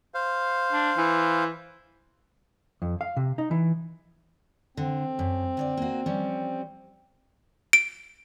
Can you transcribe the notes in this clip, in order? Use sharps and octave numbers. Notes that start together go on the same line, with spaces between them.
C5 F5
D4
E3
F2
F5
C3
D#4
E3
D3 C4
F#2
D3 C#5 D5
A#3 F#4
F3 G3 C#4
D7